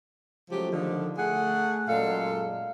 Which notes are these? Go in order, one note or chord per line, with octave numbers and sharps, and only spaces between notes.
C#3 F3 F#3 G#3 A3 G4
D3 D#3 F3
A3 G#4 F#5
F#2 A#2 G#3 A4 F5